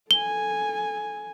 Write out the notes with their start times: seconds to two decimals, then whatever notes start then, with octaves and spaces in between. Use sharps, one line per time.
0.11 A4 G#5 G7